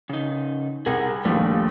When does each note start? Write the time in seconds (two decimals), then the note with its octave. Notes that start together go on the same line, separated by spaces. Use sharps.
0.10 C#3 D#4
0.86 C2 G#4 A#4 F#5
1.25 A#1 D#2 F3 G3 A3